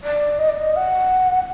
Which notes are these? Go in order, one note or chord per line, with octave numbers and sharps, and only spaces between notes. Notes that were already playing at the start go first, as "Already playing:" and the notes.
D5
D#5
D5
D#5
F#5